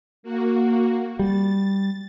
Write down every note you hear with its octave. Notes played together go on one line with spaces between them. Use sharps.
A#3 F#4
G3 A6